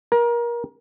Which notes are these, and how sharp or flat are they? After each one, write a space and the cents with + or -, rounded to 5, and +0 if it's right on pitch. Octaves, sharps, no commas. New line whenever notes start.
A#4 +25